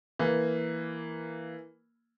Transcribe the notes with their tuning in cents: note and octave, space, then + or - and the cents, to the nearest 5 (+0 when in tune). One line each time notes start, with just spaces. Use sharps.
E3 +0 A#3 +0